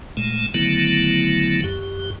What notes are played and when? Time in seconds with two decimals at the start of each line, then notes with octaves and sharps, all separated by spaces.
0.17 A#2 G#3 A3
0.54 D3 D#3 F#3 A3 B3 E4
1.64 F#2 G4